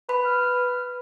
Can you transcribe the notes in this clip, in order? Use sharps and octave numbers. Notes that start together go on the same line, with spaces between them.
B4 B5
F6